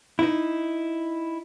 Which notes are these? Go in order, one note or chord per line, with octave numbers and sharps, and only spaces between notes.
D#4 E4